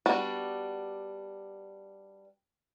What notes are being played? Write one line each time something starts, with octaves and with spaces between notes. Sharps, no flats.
G3 B3 D4 F#4